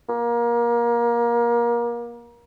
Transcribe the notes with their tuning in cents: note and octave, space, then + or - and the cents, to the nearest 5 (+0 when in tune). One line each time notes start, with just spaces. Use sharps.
A#3 +25